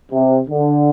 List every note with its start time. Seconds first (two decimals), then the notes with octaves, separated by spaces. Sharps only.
0.12 C3
0.49 D3